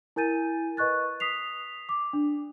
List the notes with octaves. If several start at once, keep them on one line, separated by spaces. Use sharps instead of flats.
E4 A#4 G#5 G6 A6 D#7
B4 D#5 C#6 F#6 A6
D#6 B6 C7 F7
D6
D4